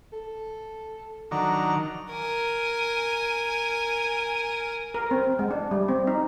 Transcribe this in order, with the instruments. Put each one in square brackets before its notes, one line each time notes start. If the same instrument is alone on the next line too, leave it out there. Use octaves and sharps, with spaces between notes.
[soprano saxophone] A4
[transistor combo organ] D#3 F#3 D4 [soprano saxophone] A#5
[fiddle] A#4 G#5
[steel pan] A#4
C4
G#3
D4
G3
C4
D#4